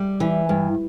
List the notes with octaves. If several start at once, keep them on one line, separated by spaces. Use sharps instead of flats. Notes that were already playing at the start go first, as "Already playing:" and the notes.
Already playing: G3
E3
G2